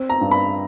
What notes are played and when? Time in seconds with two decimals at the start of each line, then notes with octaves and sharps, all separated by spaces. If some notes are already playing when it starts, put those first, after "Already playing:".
Already playing: C4
0.09 A#5
0.21 G2
0.31 B5